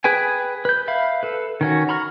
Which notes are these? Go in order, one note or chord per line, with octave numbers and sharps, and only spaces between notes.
G#4 B4 G5 G#5
B4 G6
E5 F5 B5
A4 B4
D#3 C#4 F#4
A#5 B5 C#6 F6